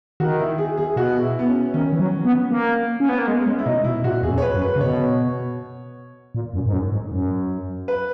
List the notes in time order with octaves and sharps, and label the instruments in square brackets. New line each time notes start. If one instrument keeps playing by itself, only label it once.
[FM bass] D#3 [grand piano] F#4
[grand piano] E4
G#4
G#4
[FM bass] B2 [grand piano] F#4
[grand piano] E4
B3
C#4
[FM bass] D#3 [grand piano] C#4
[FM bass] E3
F#3
B3
A#3
C#4
B3
A#3
[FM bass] G#3 [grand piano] B3
[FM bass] G#3 [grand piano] C#4
[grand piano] E4
[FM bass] B2 [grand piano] D#4
[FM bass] B2 [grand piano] E4
[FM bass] A#2 [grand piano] F#4
[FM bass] E2 [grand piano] G#4
[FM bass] F#2
[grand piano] C#5
B4
[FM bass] F#2
[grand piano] B4
[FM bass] C#3
[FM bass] B2 [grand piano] C#5
[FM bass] A#2
F#2
G#2
F#2
G#2
F#2
[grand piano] B4